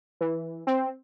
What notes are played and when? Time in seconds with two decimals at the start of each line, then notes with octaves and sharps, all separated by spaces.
0.21 E3
0.67 C4